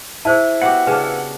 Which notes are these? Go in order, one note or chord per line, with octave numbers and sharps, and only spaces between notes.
E4 G#4 C5 A5
B3 F#4 G4 F#5
C#3 D4 B4